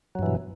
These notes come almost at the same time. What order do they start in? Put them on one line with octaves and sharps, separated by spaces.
F#3 G2 E3 B2